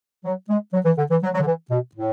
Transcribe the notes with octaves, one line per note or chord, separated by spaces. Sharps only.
F#3
G#3
F#3
E3
D3
E3
F#3
F#3
D3
E3
B2
A2